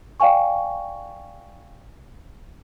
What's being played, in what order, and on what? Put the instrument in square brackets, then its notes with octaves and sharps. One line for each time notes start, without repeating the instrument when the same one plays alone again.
[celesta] D5 F5 G5 G#5 C#6